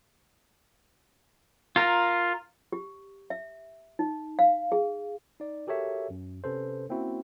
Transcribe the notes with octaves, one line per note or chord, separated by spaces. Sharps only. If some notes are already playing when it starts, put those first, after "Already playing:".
F4 A#4
G4
E5
D#4
F5
G#4
D#4 D5
F#4 G4 A4 A#4 C#5 E5
F#2
C3 C#4 A4 B4 C5
A#3 C4 C#4 E4 F#4